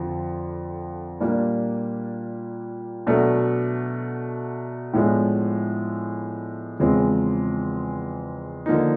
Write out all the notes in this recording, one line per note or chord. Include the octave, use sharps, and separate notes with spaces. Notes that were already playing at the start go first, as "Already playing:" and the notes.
Already playing: F2 D3 F3
A#2 G3 A#3 D4
B2 F#3 A3 D4
A2 F3 G#3 B3 D4
E2 C#3 F3 G#3 C4
D3 F3 A#3 D#4